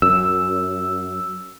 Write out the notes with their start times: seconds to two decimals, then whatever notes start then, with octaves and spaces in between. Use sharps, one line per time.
0.02 F#2 E6